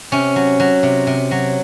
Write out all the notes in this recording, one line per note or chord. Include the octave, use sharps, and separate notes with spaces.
C3 C#4
F#3
F#3
C3
C3
F#3